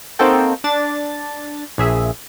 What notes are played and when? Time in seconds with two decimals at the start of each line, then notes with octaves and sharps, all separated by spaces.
0.19 A#3 C4 D#4 F#4 A4 G5
0.64 D4 A6
1.78 A#1 G#4 E5